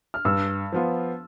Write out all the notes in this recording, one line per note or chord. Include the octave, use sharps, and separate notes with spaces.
F6
G2 E6
F3 B3 F4